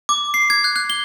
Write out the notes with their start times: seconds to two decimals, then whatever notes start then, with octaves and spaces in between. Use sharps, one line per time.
0.09 D6
0.34 C7
0.50 G#6
0.64 F#6
0.76 F#6
0.90 G7